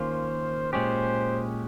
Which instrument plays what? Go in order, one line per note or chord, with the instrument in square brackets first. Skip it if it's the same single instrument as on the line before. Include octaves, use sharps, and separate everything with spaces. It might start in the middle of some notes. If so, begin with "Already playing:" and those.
Already playing: [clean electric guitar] D#3 A#3 C#4 F4 [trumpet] C5
[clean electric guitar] A#2 G#3 C#4 G4 [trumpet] C5